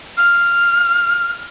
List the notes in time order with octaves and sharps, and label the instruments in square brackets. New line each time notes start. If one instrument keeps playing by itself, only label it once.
[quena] F6